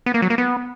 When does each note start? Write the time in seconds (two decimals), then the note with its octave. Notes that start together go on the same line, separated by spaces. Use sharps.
0.06 B3
0.14 A#3
0.22 F#3
0.30 A#3
0.38 B3